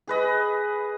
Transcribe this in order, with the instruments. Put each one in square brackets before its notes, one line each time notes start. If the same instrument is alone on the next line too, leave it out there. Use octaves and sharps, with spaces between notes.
[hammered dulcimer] G#4 B4 D#5